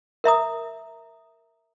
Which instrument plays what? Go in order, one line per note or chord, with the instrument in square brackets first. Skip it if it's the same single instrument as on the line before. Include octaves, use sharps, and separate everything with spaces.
[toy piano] A#4 E5 A#5 D#6